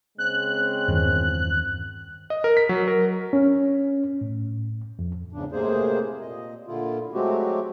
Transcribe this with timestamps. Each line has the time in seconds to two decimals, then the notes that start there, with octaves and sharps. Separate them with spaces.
0.18 C#3 G#3 C4 F#6
0.88 E2 G2 D#3
2.30 D#5
2.44 A#4
2.57 B6
2.69 F#3
2.88 A#4
3.33 C#4
4.21 A2
4.99 F2
5.33 E2 G#2 C#3 D4
5.52 A2 C3 G#3 A#3 G#4 C5
6.22 A#2 D#5
6.67 A#2 D3 E4 F4
7.13 F#3 G#3 A3 C4 F#4 G4